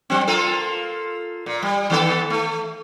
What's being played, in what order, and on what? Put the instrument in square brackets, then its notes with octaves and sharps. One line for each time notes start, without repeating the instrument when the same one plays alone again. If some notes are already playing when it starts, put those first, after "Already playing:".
[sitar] F#3 C4
A#3 F4 A4
A#2
G3
D#3 B3 A4
A3